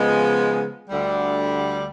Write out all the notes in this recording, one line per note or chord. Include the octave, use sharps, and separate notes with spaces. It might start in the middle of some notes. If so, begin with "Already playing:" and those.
Already playing: C#3 F3 G#3 B3
D2 D3 G3